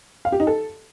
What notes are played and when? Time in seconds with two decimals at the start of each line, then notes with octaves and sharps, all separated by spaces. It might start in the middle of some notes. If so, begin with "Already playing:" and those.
0.25 F5
0.32 G4
0.40 D#4
0.47 A4